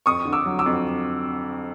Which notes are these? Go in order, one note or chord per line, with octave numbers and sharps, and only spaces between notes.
F2 C#6 D#6
D3
D6 E6
F#3
D6 E6
F2